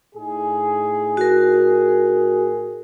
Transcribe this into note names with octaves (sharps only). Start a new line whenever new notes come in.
A2 D#4 G#4
F#4 A#4